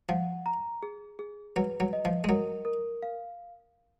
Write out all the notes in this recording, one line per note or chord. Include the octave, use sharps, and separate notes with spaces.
F3 F#5
A#5
G#4
G#4
F#3 B4
F#3
D#5
F3
G#3
F#3 A#4
A#4
F5